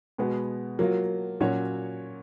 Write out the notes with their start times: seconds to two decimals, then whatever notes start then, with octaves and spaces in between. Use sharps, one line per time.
0.18 B2 G#3 B3
0.79 F#3 A#3 F4
1.40 A#2 F#3 C#4 F#4 C#5